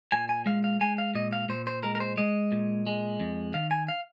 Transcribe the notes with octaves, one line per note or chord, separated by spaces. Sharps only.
A#2 G#5
G#5
G#3 F5
F5
G#3 G#5
F5
A#2 D#5
F5
A#2 C5
C5
G#3 A#4
A#4
C5
G#3 D#5
A#2
G#3
F2
D#3 F5
G#5
F5